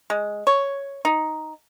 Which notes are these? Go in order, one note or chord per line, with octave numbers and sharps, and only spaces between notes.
G#3
C#5
D#4